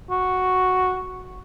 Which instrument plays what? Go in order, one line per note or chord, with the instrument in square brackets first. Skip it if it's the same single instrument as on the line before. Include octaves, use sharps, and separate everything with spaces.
[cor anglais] F#4